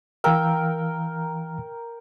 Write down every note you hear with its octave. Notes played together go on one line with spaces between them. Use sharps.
E3 A#4 F5 G5 E6